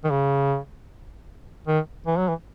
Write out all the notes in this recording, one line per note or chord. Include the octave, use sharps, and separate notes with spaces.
D#3
C#3
D#3
E3
F#3
E3